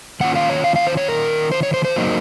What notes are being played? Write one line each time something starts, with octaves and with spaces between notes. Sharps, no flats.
D#3 A#3 C#4 F4 F#5
F5
C#5
F5
F5
C5
C#5
A#4
C5
C#5
C5
C5
F#3 A#3 D#4